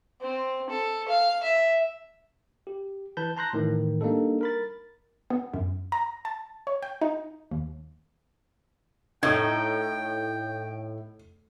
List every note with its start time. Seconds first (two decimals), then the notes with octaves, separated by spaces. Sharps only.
0.21 C4
0.70 A4
1.09 F5
1.43 E5
2.67 G4
3.17 E3 B4 A5 B5 G6
3.37 A5 A#5 C6 F#6 G6 A#6
3.53 A2 D#3 E3
4.01 G3 A#3 D4 D#4 A4
4.41 A#4 B5 A6
5.30 B3
5.54 F#2
5.92 A#5
6.25 A5
6.67 C#5
6.82 G5
7.02 D#4
7.51 D#2
9.23 A2 D#4 G5 G#6